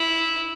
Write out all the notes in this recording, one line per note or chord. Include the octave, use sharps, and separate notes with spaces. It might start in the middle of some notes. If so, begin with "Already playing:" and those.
Already playing: E4